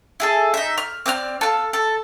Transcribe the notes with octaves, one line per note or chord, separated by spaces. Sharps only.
E4 G#4 A4
D#4 E5
F6
C4 D5 G5 F6
A4 F5
A4